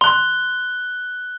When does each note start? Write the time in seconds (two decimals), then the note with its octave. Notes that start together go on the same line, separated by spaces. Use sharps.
0.01 C6 F#6 G7